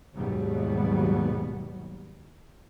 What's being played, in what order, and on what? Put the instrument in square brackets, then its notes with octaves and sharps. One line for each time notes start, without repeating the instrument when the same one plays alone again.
[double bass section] D#2 G#2 B2 F#3 G3 B3